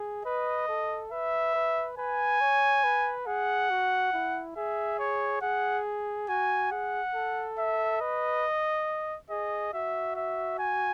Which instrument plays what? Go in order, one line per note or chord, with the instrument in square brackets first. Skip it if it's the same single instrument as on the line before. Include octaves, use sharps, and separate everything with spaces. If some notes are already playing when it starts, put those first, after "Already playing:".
Already playing: [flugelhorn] G#4
[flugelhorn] B4 [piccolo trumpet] D#5
[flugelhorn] A4
[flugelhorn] B4 [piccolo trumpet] E5
[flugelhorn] B4
[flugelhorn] B4 [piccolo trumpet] G#5
[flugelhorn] C#5
B4
[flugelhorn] G#4 [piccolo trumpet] F#5
[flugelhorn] F#4
E4
[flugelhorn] G#4 [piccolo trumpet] E5
[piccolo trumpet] C#5
[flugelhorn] G#4 [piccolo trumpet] F#5
[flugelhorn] F#4 [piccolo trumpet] G#5
[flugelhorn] G#4 [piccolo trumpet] F#5
[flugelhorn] A4
[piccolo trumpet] E5
[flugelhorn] B4 [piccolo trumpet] D#5
[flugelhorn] G#4 [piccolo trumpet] D#5
[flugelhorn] F#4 [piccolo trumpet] E5
[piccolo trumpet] E5
G#5